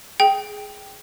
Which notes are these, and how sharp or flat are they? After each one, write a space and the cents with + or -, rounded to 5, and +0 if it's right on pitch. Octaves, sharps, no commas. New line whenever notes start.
G#4 +5 G5 +0